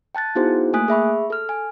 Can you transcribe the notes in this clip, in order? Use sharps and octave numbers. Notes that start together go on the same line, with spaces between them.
G5 A5 F#6 A6
B3 D#4 E4 F#4 G#4 C5
A3 A#3 G#5 D#6 F#6 B6
G#4 E5 B5 C#6
A4 F6
G#5